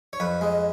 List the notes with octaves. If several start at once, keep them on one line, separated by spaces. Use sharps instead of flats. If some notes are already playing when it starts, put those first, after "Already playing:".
C#5
F2 B4
G#3